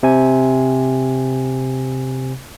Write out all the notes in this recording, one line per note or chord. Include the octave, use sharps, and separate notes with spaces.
C3 G#5